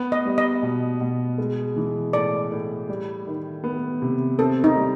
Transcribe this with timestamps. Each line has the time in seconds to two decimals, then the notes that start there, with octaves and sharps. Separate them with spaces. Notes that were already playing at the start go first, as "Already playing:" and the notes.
Already playing: B3
0.12 D#5
0.25 G3
0.38 D#5
0.62 B2
1.00 B2
1.38 G#3
1.76 E3
2.13 A2 D5
2.52 A2
2.88 G3
3.27 D#3
3.64 B3
4.02 C3
4.39 C4 A4
4.64 D#4
4.77 G3